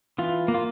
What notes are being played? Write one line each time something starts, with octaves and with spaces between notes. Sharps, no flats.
E3 F4
A#3
F4